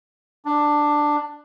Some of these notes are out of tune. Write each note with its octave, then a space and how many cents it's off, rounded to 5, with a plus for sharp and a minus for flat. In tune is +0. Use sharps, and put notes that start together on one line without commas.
D4 +10